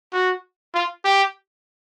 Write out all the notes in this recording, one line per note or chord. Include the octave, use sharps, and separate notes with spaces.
F#4
F4
G4